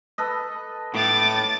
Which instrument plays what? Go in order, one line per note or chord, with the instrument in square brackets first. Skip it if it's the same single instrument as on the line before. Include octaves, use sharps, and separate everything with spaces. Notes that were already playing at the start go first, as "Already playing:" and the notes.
[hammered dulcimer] A4 B4 D#5
[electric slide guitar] A2 [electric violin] D6 A6